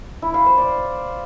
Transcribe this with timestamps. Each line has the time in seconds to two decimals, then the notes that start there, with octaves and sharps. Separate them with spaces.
0.22 E4
0.34 F5
0.46 C5
0.58 D5